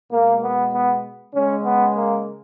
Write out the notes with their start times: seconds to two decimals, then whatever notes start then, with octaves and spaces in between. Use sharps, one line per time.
0.11 B2 G#3 A#3
0.42 B3
0.72 B3
1.34 C#3 G#3 C#4
1.64 B3
1.95 A#3